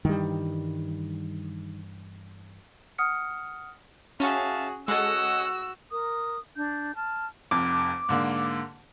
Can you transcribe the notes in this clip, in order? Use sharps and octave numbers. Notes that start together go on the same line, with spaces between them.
G2 D#3 E3 G3
F#5 D#6 F6 C#7
C#4 F#4 G#4 E5 F5 A5
G#3 C#4 F#4 A4 D#5 F#5 E6
A#4 D#6
D4 G6
A5 F6
F1 F2 D6
G#2 D3 A#3